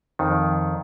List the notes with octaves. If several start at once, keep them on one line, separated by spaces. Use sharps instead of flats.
F2 D#3